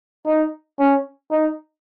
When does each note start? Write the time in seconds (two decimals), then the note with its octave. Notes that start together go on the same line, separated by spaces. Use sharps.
0.27 D#4
0.79 C#4
1.31 D#4